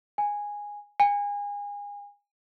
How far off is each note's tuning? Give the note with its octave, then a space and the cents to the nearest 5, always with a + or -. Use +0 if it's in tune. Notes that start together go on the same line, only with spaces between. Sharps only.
G#5 -10
G#5 -30